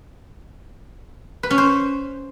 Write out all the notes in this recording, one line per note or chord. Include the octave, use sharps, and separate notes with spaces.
B4
C#4
C5